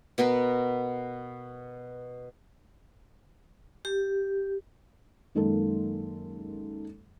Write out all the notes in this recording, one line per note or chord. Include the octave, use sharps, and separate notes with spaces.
B2 B3 A#4 B4
G4
F#2 D#3 G#3 A#3 A4